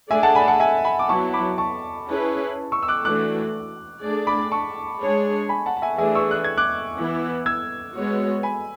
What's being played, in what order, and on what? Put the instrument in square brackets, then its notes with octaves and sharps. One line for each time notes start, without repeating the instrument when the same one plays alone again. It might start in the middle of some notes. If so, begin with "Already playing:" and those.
[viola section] A3 D4 G#4 D5 [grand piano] E5 G#5
[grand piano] F#5 A5
G#5 B5
F#5 A5
E5 G#5
G#5 B5
D6
[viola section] F#3 B3 E4 [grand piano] A5 C#6
[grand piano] B5 D6
A5 C#6
[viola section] C#4 E4 G#4 B4
[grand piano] C#6 E6
E6
D6 F#6
[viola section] E3 A3 D4 F#4 [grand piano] D6 F#6
[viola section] A3 D4 G#4 D5
[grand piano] B5 D6
A5 C#6
[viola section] G#3 D4 G#4 C#5
[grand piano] G#5 B5
F#5 A5
A5
E5 G#5
[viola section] E3 A3 D4 G#4 [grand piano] E5 G#5
[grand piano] C#6 E6
F#6
G#6
D6 F#6
[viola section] E3 B3 E4
[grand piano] E6 G#6
[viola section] G#3 B3 F#4 C#5
[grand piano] G#5 B5